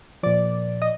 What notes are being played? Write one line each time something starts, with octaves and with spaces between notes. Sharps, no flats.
A#2 F3 D5
D#5